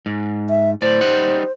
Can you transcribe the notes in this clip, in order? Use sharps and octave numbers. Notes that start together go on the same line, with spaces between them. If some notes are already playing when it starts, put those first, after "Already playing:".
G#2
E5
A2 C5 D5
G3 D#4 F#5